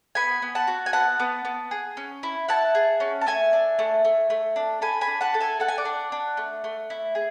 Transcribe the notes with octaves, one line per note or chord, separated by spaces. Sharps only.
B3 G#5 B5
B3
F#5 A5
F#4
G#5
B3 F#5 A5
B3
B3
G#4
C#4
E4
E4 F#5 A5
G#4
C#4
A5
A3 E5 G#5
D4
A3
A3
A3
D4
A4 G#5 B5
G#5 B5
D4
F#5 A5
A4
E5 G#5
A4 F#5
G#5
D5 F#5
D4
D4
A3
A3
E4
G#4